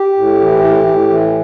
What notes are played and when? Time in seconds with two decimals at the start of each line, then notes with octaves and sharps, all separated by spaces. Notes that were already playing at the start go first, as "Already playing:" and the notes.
Already playing: G4
0.17 A2
0.41 E3
0.64 A2
0.87 A2
1.10 E3